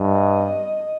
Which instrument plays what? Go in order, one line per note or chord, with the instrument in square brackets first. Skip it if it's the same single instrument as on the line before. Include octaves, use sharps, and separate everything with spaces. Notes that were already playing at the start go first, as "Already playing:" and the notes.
Already playing: [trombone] G2 [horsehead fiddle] D#5